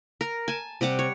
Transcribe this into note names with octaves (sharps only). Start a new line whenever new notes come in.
A#4
G#5 A5
C3 G3 F#5 D6
C#5